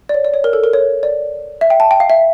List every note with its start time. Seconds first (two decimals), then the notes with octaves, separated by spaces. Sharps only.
0.09 D5
0.14 C#5
0.24 D5
0.34 C#5
0.44 A#4
0.53 A4
0.64 A#4
0.73 C#5
1.03 D5
1.61 E5
1.70 G5
1.80 A5
1.91 G5
2.00 F5
2.10 E5